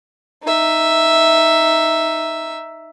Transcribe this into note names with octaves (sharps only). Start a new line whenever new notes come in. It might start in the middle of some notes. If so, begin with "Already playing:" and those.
D#4 E5